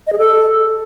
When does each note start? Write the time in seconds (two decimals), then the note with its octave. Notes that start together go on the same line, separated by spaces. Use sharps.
0.07 D#5
0.12 G#4
0.18 A4